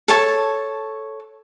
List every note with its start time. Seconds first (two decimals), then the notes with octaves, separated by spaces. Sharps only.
0.08 A4 C#5 A5